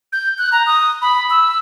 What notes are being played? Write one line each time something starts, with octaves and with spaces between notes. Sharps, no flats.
G6
F#6
A#5
D#6
B5
E6